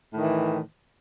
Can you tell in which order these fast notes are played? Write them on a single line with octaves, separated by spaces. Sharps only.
A2 D#3 E3